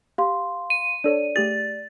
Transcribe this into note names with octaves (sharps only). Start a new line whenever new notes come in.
G4 F5 C6
D#7
D4 A4 C#5 D5
A3 G4 G#4 A6